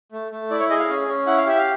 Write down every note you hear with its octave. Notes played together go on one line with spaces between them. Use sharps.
A3
A3
E4 D5
C#5
G#4 D#5
F5
C#4
C#4
E4 F#5
F5
G4 E5
F5